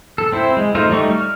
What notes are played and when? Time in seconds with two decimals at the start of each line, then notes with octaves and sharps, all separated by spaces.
0.18 A4
0.32 C4 E4 C5
0.57 G#3
0.75 A3 D#4 F4 C5
0.90 G3 A3 D#4 C#6
1.11 F6